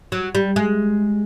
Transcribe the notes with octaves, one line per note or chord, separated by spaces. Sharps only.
F#3
G3
G#3